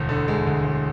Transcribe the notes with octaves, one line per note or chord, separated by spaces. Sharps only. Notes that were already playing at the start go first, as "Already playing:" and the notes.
Already playing: E1 D2
D3
G#3
D2
E1